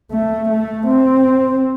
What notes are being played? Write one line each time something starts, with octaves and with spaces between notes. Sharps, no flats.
A3
A3
C4